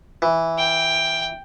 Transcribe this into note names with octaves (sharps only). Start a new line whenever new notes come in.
E3
G5